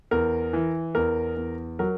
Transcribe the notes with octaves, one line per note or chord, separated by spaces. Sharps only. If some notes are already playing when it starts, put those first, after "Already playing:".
E2 A#4
E3
E2 A#4
E2
F#3 A#4